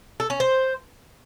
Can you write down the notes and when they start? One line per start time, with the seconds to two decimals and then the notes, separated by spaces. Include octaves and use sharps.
0.20 A4
0.30 C#4
0.40 C5